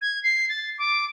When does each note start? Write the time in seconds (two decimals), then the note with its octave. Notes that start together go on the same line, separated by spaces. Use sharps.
0.01 G#6
0.23 C7
0.49 A6
0.78 D6